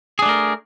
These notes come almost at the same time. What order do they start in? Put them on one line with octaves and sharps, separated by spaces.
G#4 D4 A3 A#4